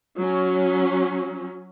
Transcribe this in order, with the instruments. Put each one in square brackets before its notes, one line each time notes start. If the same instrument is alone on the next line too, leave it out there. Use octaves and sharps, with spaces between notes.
[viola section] F#3 C#4